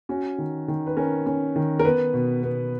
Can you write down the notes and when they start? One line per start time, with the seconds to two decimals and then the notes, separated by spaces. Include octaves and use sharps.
0.09 C#4 F#4
0.38 D#3
0.68 D#3
0.87 B4
0.97 C#4 A#4
1.26 C#4
1.56 D#3
1.79 A#4
1.85 B3 B4
2.14 B2
2.43 B3